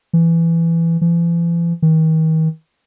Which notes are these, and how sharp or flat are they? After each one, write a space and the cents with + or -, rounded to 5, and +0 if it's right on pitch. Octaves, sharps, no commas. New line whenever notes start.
E3 +15
E3 +45
D#3 +40